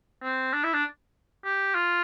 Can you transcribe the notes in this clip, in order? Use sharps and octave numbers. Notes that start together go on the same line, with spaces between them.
C4
D4
E4
D4
G4
F4